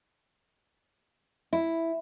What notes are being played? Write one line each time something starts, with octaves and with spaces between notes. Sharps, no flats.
E4